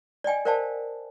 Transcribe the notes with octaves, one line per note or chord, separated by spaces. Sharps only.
D5 D#5 G5 G#5
A#4 C5 D5 F5 G5 A5